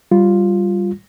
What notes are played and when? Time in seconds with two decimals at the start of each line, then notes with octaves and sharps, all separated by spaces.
0.11 G3 F4